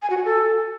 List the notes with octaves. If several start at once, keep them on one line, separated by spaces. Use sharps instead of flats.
G#5
F#4
G#5
A4